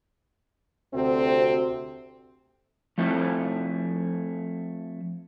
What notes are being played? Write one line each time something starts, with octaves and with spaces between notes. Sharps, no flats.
D2 C3 C4
F3 A3 C4 E4 A4